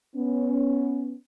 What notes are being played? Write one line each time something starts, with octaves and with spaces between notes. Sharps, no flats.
B3 C#4